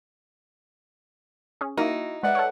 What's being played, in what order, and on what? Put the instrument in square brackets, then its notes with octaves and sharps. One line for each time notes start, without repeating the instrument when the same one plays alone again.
[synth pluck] C#4 G#4
[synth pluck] A#3 [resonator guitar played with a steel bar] D#4 [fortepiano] E4 F#4
[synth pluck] G#3 [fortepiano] B4 D5 E5 [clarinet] F#5
[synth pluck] A4 C#5